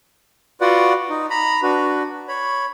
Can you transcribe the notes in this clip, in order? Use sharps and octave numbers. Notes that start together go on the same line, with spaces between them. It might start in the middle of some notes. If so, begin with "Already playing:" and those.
F4 F#4 B4 D5 F#5
D#4
A#5 B5
D4 F#4 B4
C#5 B5